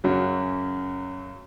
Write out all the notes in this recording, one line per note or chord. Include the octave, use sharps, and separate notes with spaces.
F#2 C#3 F#3